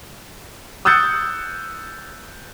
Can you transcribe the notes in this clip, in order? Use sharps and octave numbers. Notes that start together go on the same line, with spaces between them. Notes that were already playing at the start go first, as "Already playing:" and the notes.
D#6 E6 F#6 G6 A6 C#7